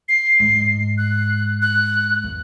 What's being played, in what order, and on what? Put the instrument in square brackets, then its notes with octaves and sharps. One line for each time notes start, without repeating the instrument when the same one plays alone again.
[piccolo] C7
[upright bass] G#2
[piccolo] F#6
F#6
[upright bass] E2